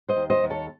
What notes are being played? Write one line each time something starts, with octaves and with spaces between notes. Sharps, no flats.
C5 D#5
D#2
C5 D#5
D#2
A4 C#5